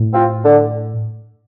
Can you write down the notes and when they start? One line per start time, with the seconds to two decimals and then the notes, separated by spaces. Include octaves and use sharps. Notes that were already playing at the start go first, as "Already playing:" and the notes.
Already playing: A2
0.13 C4 F4
0.45 D3